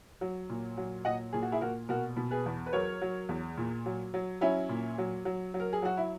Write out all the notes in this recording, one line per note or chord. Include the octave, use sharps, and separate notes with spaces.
F#3
A#2
F#3
A#2 D#5 F#5
A#2 G#4
F#4
E4 G#4
A#2 F#4 A#4
B2 F#4 A#4
B2
G#4 B4
E2
B4
F#3 A#4 C#5
F#3
E2
A#2
F#3
F#3
F#3 C#4 E4
A#2
F#3
F#3
F#3
A#4
G#4
F#3 F#4
E4